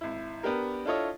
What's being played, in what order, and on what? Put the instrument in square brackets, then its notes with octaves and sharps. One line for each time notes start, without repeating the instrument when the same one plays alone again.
[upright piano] G#1 E4
B3 D4 G4 A#4
D4 E4 F4 A4 C#5 D#5